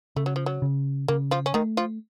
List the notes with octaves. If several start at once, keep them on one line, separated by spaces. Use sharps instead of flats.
C#3 A3
F#3
F3
F#3
C#3
C#3 A#3
F3 F4
C#4
D#3 A3 D#4
F3 F4